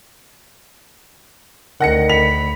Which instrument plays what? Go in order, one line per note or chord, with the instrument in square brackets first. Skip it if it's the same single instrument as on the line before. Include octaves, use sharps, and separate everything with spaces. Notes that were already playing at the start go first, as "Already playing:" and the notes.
[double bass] D2 [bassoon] D#3 [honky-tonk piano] F#5 A#6 C#7
[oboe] B5 [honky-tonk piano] F7